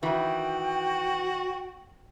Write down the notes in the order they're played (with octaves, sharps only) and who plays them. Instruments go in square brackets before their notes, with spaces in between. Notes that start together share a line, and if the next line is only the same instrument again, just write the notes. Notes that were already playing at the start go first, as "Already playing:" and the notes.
[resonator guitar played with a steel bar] D#3 E3 [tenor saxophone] F#4 [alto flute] G5